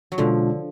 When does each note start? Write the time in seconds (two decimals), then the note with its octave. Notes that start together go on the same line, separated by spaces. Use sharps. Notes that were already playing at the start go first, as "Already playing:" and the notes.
0.12 F#3
0.18 B2 D3 F3 G#3 D4 F4